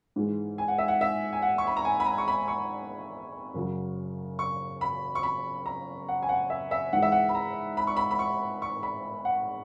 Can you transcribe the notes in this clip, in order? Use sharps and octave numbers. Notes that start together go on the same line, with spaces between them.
G#2 E3 G#3
G#5
F#5
E5
F#5
E5
G#5
F#5
C#6
B5
A#5
G#5
B5
A#5
C#6
B5
C#6
F#2 C#3 F#3
C#6
B5
C#6
B5
A#5
F#5
G#5
F#5
E5
E5
G#2 E3 G#3 F#5
E5
F#5
B5
A#5
B5
C#6
B5
B5
C#6
C#6
B5
F#5